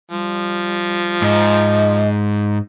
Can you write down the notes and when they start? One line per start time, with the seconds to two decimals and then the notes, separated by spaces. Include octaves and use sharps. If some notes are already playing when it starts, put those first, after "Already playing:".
0.11 F3 G3
1.22 G#2 D#5